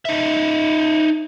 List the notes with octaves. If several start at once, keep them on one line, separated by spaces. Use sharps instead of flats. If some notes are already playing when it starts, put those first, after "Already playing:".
D#4 E5